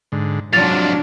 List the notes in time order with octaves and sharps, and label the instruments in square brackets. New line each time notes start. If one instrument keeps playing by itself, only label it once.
[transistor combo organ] G#2 D3
[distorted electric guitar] G#2 C3 [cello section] F3 F#3 D4 [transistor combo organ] F4 [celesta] A6 F7